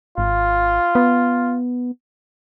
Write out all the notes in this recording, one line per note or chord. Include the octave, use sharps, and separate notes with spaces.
G#1 F4
B3